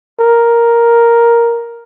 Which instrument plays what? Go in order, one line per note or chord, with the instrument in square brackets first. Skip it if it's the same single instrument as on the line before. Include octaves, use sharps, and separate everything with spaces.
[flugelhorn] A#4